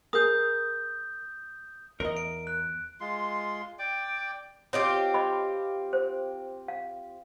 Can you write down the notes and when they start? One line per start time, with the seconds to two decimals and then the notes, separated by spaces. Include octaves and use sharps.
0.13 G#4 A#4 D#6 G6
2.00 E2 A#4 D#5
2.17 D7
2.47 F#6
3.01 G#3 F4 C6
3.79 D5 G5 D6
4.73 C4 F4 G4 C#5 D#5
5.14 D#5 B5
5.93 C5
6.68 F5